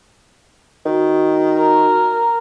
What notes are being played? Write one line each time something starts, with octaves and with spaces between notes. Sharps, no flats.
D#3 F#4
A#4